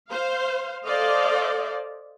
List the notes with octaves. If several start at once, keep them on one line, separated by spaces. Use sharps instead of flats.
C5 F5
A4 C5 D5 D#5 F5